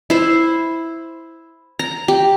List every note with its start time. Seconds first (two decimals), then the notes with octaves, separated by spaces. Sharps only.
0.10 E4 C5
1.79 A#5
2.08 G4